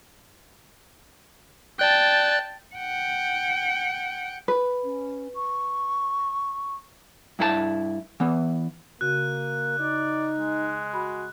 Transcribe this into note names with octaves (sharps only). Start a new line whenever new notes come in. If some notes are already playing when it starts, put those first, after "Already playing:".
D5 G5 A5 F#6
F#5 G5
B4
C#4
C#6
G2 E4 A4 A5
E3 B3
C#3 A#3 F#4 F#6
D#4 D5
G#3
F#4 B5